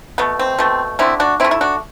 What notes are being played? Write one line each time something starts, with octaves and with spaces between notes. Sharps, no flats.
B2 A3 B3
C4
B2 A3
D3 A3 C4 E4
D4 F#4
D3 A3 C4 E4
E4
D4 F#4